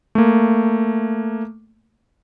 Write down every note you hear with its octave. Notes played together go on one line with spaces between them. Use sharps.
A3 A#3